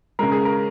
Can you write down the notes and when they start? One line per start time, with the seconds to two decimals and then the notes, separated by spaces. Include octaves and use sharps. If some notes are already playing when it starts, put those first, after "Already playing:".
0.19 C#3 G#3 A#4
0.32 G#4
0.45 A#4